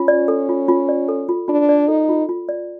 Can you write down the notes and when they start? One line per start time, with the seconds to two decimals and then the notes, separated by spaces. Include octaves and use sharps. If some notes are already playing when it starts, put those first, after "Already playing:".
Already playing: C#4 F4
0.08 D5
0.28 A4
0.49 F4
0.68 F4
0.89 D5
1.08 A4
1.29 F4
1.48 D4 F4
1.69 D5
1.88 D#4 A4
2.09 F4
2.29 F4
2.49 D5